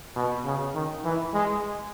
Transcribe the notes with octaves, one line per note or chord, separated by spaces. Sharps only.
B2
C#3
D#3
E3
G#3